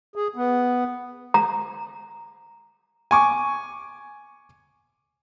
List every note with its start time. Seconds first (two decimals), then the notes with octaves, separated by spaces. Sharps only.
0.16 G#4
0.36 B3
1.34 A#5
3.11 G#5 C#6 D6